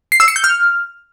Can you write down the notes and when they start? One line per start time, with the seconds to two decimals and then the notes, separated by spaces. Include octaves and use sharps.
0.12 C7
0.20 E6
0.28 C#7
0.36 G6
0.44 F6